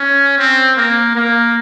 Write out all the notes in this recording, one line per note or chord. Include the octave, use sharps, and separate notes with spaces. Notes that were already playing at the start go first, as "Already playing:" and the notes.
Already playing: C#4
C4
A#3
A#3